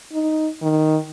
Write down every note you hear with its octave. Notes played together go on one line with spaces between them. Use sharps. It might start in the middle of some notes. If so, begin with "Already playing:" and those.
D#4
D#3